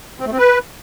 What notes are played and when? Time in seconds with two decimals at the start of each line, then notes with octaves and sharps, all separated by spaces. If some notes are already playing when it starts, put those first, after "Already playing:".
0.20 C4
0.26 A3
0.32 C4
0.38 B4